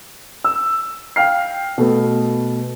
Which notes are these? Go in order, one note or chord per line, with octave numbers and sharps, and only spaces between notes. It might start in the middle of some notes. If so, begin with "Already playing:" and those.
E6
F5 G5 F6 C7
B2 A3 B3